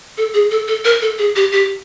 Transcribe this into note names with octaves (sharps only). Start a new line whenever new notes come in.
A4
G#4
A4
A4
A#4
A4
G#4
G4
G4